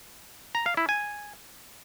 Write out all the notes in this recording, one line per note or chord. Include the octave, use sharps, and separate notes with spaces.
A#5
F5
E4
G#5